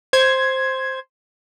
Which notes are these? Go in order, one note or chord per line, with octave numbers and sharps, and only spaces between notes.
C5 G#6